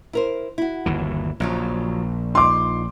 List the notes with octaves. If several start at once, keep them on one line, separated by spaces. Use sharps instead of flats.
E4 A#4 C5
E4 F#4
G1 D#2 E3
A#1 C#3 F3 F#3
D#4 F4 C6 D6